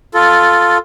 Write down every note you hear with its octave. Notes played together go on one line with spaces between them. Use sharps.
F4 A4